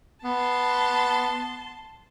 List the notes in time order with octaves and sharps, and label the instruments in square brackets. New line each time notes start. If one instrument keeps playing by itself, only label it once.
[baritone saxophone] B3 [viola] A5 C6